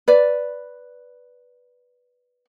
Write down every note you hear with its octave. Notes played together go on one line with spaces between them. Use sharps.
B4 D5